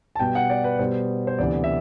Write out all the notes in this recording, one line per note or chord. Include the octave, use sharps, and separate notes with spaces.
A5
B2 G3 B3 G5
F#5
D5
B4
B2 G3 B3 C5
C5
D2 C3 E3 B3 D5
E5